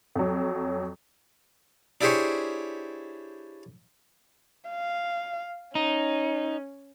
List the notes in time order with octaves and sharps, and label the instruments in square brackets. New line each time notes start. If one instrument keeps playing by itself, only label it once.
[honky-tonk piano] F2 F#3
[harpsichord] D4 E4 G4 G#4 C5 C#5
[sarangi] F5
[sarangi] C#4 [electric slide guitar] D#4